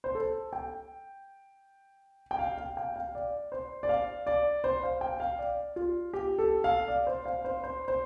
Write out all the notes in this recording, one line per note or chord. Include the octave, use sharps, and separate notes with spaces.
C5
A4
G5
G5
F5
F5
G5
F5
D5
C5
D5
F5
D5
C5
F5
G5
F5
D5
F4
G4
A4
F5
D5
C5
F5
C5
C5
C5